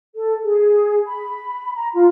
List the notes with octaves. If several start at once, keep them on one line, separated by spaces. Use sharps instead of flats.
A4
G#4
B5
A#5
F4